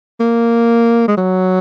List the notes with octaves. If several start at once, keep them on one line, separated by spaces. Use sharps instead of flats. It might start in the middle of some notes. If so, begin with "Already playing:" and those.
A#3
G#3
F#3